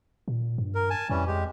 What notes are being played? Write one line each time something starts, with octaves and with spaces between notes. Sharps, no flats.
A#2
G2
A#4
G#5 A5
F2 E3 G3 C#4
G#3 G4